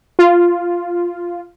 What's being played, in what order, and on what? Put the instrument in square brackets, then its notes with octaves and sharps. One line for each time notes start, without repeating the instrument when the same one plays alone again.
[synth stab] F4